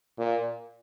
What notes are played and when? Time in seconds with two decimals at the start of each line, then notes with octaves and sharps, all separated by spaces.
0.19 A#2